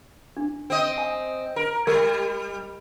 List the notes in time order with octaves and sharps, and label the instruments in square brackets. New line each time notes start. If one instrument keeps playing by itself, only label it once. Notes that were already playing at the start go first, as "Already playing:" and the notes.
[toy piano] D4
[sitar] C4 D#5
[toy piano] G#5
[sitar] A#4
[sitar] G3 [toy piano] A#4